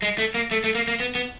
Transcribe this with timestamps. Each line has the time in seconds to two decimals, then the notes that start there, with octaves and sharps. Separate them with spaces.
0.02 G#3
0.18 A3
0.34 A#3
0.51 A3
0.64 A3
0.75 A#3
0.87 A#3
1.00 B3
1.15 B3